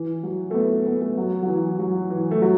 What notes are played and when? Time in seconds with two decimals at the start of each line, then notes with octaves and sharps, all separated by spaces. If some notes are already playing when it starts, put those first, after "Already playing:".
Already playing: E3
0.23 F#3
0.51 A3
0.54 B3
0.87 B3
1.01 A3
1.17 F#3
1.43 F#3
1.48 E3
1.79 F#3
2.10 E3
2.31 A3
2.42 F#3